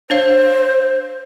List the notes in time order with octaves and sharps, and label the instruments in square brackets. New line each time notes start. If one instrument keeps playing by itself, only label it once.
[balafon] D4 C#5 F5 [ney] C5